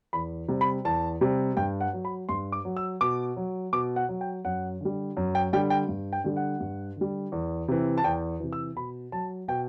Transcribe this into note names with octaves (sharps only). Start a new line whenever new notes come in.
E2 B5
C3 G3
B5
E2 A5
C3 G3
G2 G5
F#5
F#3
B5
G2 C6
D6
F#3
E6
B2 D6
F#3
B2 D6
F#5
F#3
G5
F#2 F#5
D3 G3
F#2
G5
D3 G3 G5
G5
G2
G5
D3 G3
F#5
G2
D3 G3
E2
C3 E3
A5
E2 G5
C3 E3
E6
B2 B5
F#3 A5
B2 G5